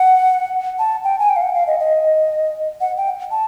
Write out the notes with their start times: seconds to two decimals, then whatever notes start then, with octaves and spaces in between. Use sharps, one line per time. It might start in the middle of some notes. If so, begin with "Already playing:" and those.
Already playing: F#5
0.79 A5
1.04 G5
1.19 G#5
1.29 G5
1.36 F5
1.42 F#5
1.55 F5
1.67 D#5
1.80 D#5
2.81 F#5
2.97 G5
3.31 A5